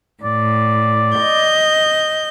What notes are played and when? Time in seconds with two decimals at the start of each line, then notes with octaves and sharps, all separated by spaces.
0.23 A2 D5
1.18 D#5 G6